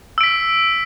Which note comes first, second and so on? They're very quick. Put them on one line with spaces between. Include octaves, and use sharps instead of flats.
E6 D7 B6